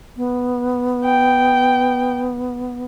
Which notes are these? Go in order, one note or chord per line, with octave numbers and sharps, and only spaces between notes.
B3
G5